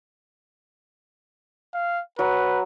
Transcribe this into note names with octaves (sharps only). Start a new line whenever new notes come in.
F5
F#3 B4